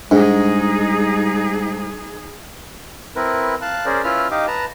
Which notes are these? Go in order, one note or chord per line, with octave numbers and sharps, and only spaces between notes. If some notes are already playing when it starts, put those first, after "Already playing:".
G#2 G3 D4 D#4 G#4
C4 E4 A#4 B4
F5 A5 F#6
C#4 G#4 A#4 C5 D5
C#4 E4 F4 B4 E5 F6
D#4 G4 D#5 F5 D6
B4 A5 A#5